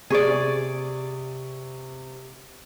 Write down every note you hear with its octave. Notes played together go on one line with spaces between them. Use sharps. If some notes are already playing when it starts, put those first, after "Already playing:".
C3 G#4 D5 C#6